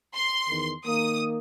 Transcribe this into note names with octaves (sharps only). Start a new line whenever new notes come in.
C6
E2 D#3
D#3 A#3 D#6